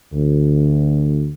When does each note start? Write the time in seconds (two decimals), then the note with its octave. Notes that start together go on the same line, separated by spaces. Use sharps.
0.13 D2